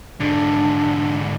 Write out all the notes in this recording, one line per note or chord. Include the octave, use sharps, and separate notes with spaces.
G#2 D3 D4